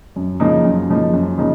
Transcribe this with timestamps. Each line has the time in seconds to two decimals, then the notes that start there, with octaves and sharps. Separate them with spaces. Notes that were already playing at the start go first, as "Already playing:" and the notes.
0.16 F#2
0.40 C#3 F3 A#3 D#4
0.65 F#2
0.89 C#3 F3 A#3 D#4
1.14 F#2
1.38 C#3 F3 A#3 D#4